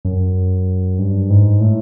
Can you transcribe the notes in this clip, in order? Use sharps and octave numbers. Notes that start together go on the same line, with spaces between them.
F#2
G2
G#2
A2